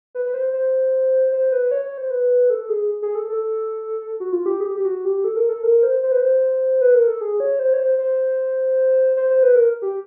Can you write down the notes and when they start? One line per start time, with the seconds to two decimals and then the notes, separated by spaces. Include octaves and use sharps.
0.15 B4
0.26 B4
0.34 C5
0.53 C5
1.32 C5
1.52 B4
1.71 C#5
1.85 C#5
1.98 C5
2.10 B4
2.50 A4
2.69 G#4
3.02 G#4
3.15 A4
3.28 A4
4.20 F#4
4.33 F4
4.46 G4
4.60 G#4
4.66 G4
4.76 G4
4.85 F#4
5.05 G4
5.24 A4
5.36 A#4
5.49 A4
5.63 A#4
5.83 C5
6.03 C5
6.12 B4
6.20 C5
6.81 B4
6.95 A#4
7.07 A4
7.21 G#4
7.40 C#5
7.59 C5
7.73 C#5
7.80 C5
7.99 C5
9.17 C5
9.30 C5
9.43 B4
9.55 A#4
9.82 G4